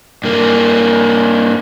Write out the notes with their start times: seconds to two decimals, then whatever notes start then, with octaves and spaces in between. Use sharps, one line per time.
0.24 G2 A#3